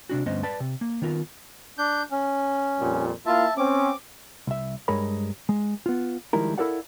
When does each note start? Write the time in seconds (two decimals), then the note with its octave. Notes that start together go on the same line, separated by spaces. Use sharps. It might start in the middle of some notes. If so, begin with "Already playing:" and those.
0.09 C3 D4 F#4
0.26 D2 G2 B3 C#4 C5 D#5
0.43 B4 D5 A5
0.60 C3
0.81 A#3
1.02 D#3 B3 F4 A#4
1.78 D4 G6
2.11 C#4
2.81 F2 A#2 G3
3.26 A#3 E4 F4 E5 A5
3.57 C4 C#4 D6
4.47 C2 E5
4.88 G2 G#3 G#4 A#4 C#5 B5
5.49 G#3
5.86 B3 F4
6.33 D#3 F3 G3 G#3 E4 A#4
6.58 E4 A4 A#4 D5 F5 F#5